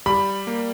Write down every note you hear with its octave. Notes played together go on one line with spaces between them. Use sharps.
G3 B5
A#3